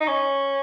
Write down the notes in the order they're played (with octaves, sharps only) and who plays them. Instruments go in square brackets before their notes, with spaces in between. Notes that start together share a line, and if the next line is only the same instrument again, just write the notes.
[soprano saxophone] D#4
[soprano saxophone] C#4 [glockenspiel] C#6